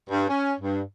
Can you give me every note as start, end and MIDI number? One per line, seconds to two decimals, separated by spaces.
0.10 0.26 43
0.28 0.53 61
0.60 0.82 43